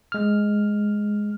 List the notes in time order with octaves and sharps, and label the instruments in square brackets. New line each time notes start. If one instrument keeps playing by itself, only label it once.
[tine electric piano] G#3 F6